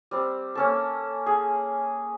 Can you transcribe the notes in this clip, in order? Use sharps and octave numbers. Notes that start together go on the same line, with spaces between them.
G3 C4
A#3 C#4 A4
G#4